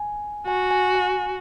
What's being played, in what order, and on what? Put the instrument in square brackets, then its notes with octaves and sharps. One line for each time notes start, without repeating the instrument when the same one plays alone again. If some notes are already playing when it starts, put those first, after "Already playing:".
Already playing: [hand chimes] G#5
[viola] F#4 [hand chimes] G#5
[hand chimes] G#5
G#5